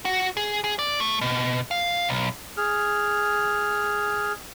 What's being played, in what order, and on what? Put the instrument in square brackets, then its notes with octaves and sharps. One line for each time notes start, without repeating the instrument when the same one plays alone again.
[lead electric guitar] F#4
G#4
G#4
D5
A3
B2
F5
B1
[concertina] G#4 F6